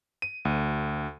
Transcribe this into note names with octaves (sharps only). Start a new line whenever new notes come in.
D#7
D2